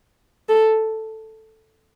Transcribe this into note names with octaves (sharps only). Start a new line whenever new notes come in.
A4